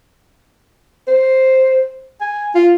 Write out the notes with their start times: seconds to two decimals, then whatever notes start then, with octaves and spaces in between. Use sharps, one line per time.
1.08 C5
2.21 G#5
2.55 F4